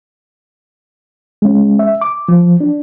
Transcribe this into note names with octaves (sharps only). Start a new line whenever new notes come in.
G#3 C#4
E5
D6
F3
D4